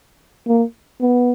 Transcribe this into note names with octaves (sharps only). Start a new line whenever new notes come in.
A#3
B3